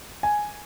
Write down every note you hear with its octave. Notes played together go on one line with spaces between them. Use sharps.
G#5